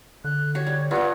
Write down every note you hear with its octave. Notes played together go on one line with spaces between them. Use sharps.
D3 F#6
F#4 G4 C#5
G3
G2 B3 F4 F#5